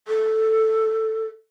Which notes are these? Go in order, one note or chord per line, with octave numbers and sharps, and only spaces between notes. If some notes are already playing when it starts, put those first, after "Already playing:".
A4